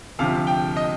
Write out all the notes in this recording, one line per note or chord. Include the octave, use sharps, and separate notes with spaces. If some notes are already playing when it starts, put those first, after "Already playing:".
D2 C3 F3 F5
G5
D#5